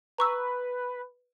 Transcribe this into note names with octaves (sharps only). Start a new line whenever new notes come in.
B4 A#5 C#6 E6